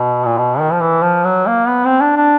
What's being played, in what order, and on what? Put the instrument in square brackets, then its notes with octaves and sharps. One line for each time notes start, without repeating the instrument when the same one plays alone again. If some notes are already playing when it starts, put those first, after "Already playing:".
Already playing: [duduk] B2
A#2
B2
D#3
F3
E3
F3
F#3
A#3
B3
C4
D4
D4